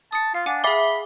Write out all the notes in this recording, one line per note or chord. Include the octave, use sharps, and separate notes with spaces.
A5 D#6 C#7
F4 F5
D4 F#5 G#5 D6
G#4 E5 B5 D6 A6 G7